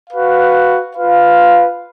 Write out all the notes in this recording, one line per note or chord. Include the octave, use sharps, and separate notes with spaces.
F#4 B4 F5
F4 B4 F5